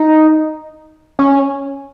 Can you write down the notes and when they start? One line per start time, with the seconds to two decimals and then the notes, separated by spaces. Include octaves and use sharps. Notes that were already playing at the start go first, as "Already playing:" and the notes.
Already playing: D#4
1.19 C#4